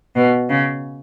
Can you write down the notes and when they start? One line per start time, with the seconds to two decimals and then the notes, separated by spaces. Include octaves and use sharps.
0.15 B2
0.49 C#3